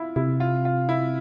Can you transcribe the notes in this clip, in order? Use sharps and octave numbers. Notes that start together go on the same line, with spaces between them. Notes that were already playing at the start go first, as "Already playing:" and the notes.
Already playing: E4 F4
C3 E4
F4
F4
E4